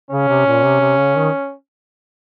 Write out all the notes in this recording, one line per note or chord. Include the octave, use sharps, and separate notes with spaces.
C#3 C#4
C3
A#2
C3
C3
C#3
D#3